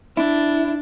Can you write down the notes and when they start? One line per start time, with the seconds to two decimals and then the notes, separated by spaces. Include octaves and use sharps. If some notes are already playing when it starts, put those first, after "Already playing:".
0.17 D4 E4